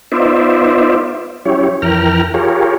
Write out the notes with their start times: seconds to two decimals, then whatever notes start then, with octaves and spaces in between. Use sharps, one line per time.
0.12 B3 D#4 F4 C5 D5 E5
1.45 F#3 C#4 E4 G4 C#5
1.82 F2 E3 A#4 G5 A#5 F6
2.34 F4 G4 G#4 A#4 C#5